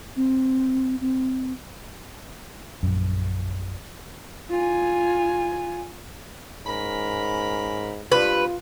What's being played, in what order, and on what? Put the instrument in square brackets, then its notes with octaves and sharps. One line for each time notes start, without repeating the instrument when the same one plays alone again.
[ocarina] C4
C4
[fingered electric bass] A#1 F#2
[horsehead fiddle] F4 G#5
[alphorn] G#2 [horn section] C#4 A#4 B5
[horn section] G2 C3 [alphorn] F4 [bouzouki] B4